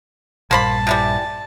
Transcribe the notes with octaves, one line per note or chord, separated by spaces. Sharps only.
A#1 G2 A#3 C5 A5 B5
C3 E3 G3